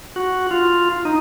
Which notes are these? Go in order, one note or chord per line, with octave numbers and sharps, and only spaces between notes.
F#4
F4
D#4